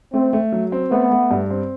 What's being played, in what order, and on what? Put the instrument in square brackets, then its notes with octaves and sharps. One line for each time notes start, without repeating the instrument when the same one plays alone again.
[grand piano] A3 [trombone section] C4
[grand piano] A3
F#3
C4
[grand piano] A3 [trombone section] B3
[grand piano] A3
G2
C4